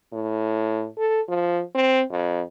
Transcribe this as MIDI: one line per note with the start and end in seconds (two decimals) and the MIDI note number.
0.13 0.86 45
0.98 1.21 69
1.28 1.62 53
1.75 2.02 60
2.11 2.42 41